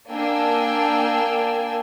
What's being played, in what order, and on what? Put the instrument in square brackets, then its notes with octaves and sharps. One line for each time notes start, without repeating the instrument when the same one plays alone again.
[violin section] A#3 D4 G5 G#5 E6